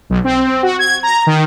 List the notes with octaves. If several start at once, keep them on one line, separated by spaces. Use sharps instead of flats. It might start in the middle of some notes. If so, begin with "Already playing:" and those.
B1
C4
F#4
G#6
A#5
D#3